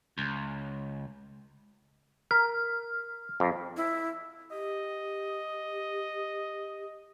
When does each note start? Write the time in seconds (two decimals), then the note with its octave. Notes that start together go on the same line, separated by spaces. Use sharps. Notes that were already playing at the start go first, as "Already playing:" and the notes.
0.18 C#2
2.31 A#4 F6
3.40 F2
3.77 E4
4.51 G4 D#5